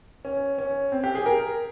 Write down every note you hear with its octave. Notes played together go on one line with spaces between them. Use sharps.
C#4
C#4
C4
G4
G#4
A#4